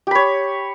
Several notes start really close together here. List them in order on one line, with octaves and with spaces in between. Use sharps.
G4 B5 C#5